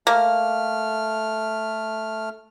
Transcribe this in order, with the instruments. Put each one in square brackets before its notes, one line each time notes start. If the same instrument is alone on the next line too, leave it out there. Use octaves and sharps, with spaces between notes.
[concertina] A3 F6 [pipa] A#3